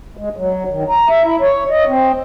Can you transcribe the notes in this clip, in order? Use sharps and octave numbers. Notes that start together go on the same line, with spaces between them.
G#3
F#3
D#3
A#5
E5
E4
C#5
D#5
C4